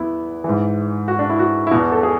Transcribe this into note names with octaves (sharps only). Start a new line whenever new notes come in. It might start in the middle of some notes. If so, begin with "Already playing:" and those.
Already playing: E2 B3 E4
G#2 E3
F#4
D4
E4
F#4
E4
E2 B2 F#4
A4
G#4